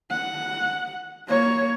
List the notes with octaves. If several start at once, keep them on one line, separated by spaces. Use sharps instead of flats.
F#5
A#3 C#5